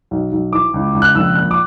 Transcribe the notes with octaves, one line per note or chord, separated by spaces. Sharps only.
B1
B1
E3 D6
C#2
C#2
F#6
A#1 E6
A#2 F#6
D6